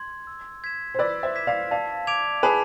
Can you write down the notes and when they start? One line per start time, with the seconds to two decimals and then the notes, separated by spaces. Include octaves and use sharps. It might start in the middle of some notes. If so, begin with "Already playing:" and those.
Already playing: C6 G#6
0.27 E6
0.64 G#6 B6 E7
0.94 C5
0.99 B4 D5 E6
1.23 C5 E5
1.35 G#6 B6 E7
1.47 D5 F5
1.71 D5 F5 A5
2.07 D6 G#6 D7 F7
2.43 G#4 B4 A5